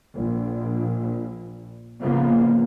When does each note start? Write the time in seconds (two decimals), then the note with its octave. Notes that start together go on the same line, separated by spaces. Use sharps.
0.14 A#1
2.02 A2 C#3 F3 A#3 B3